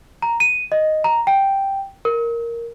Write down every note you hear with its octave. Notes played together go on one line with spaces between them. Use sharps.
A#5
D#7
D#5
A#5
G5
A#4